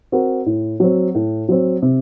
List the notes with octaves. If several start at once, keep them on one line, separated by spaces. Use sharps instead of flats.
C4 F#4 A#4
A2
F#3 C4
A2
F#3 C4
C3